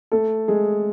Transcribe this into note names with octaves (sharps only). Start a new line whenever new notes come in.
A3 A4
G#3 G#4